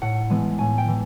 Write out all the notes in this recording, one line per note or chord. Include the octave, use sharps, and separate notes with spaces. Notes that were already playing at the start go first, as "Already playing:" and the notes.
A2 F#5
E3 G#3 B3
A2 G#5
G5
E3